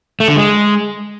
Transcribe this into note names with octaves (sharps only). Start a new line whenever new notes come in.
A3
D3
G#3